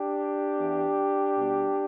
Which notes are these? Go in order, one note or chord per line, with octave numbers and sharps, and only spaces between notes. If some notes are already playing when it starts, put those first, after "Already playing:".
Already playing: D4 G4
E2 E3 B3
B2 G3 B3